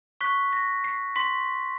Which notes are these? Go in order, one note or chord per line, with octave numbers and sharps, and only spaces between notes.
C#6 F#6 B6
A#6
C7
C6 B6